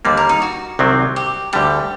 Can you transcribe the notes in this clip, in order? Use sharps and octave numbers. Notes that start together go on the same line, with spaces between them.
D#2 D3 G3 A#3 D5
A#4
D#4
F#4
C2 C3 D#3 F#3 C4
G4
D2 D3 G3 G4